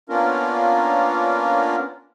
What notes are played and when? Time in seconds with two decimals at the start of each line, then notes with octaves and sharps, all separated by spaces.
0.09 A#3 B3 C#4 D4 F4 A#4